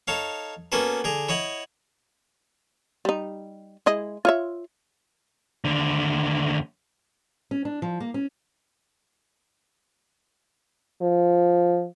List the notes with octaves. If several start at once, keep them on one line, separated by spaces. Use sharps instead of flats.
D#4 A4 C#5 F5
A#3 B3 C#4 F#4 A4 B4
D3 G#4 A#5
E4 C#5 D#5 F#5
G3 D#4
G#3 E4 D#5
F4 C#5 E5
D#2 D3
C#4
D4
F3
A#3
C#4
F3